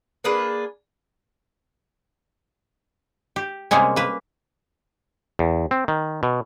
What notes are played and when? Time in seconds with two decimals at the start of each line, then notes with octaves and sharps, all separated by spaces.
0.24 A#3 D4 G#4 B4
3.36 G4
3.71 C3 G3 G#3 A#3 C#4
3.96 A#3 B4
5.39 E2
5.71 C4
5.88 D#3
6.23 B2